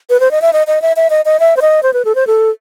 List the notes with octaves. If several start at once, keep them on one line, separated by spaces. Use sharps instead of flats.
B4
C5
D#5
E5
D#5
D#5
E5
E5
D#5
D#5
E5
C5
D#5
C5
B4
A4
C5
A4